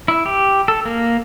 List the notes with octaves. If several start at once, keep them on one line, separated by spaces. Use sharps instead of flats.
E4
G4
A4
A#3